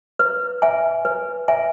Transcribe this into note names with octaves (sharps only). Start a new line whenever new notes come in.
B4
E5 G#5
B4
E5 G#5